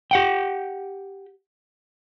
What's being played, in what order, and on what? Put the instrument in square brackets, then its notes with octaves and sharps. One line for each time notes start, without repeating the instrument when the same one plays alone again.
[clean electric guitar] G4 F#5 G5